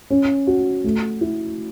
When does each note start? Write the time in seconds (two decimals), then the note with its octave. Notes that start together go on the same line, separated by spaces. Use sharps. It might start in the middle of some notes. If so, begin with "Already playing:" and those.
0.10 C#4
0.47 F#4
0.84 A3
1.21 E4